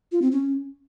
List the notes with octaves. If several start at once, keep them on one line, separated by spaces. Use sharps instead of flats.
F4
C4
C#4